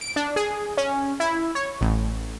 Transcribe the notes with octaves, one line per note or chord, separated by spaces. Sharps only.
D7
D4
G#4
C#4
E4
C#5
A1